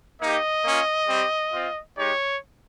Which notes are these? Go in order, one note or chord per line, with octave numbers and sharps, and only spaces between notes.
A#3 D#4 G4 D#5
A#3 C#4 F4
G3 C4 G4
C4 F4
G#3 D#4 G4 C#5